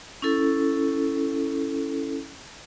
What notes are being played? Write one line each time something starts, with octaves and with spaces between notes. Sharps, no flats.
C#4 E4 A4